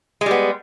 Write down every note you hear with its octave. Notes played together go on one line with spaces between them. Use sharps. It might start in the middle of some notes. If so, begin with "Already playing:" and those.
G3 G#3 B3